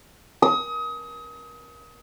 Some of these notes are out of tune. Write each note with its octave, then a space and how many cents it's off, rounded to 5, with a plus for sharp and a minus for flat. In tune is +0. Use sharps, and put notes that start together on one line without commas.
D#6 +30